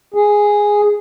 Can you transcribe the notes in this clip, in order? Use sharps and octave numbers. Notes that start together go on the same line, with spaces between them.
G#4